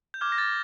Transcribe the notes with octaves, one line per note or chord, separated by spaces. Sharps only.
G6
D6 F6 G#6
A#6
A6